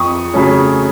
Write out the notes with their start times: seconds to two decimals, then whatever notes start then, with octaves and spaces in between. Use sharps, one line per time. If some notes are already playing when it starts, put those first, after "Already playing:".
Already playing: F2 C#6 D#6
0.34 C#3 F#3 A3 C#4